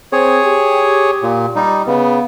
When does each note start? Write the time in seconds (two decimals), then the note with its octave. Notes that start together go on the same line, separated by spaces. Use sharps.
0.13 C4 G#4 C#5
0.44 G4
1.23 A#2
1.56 G3 D#4
1.87 C#3 B3